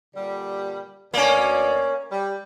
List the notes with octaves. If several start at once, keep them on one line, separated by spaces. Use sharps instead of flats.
A#2 D3 G3
D2 B2 A#3 C#4 D5
G3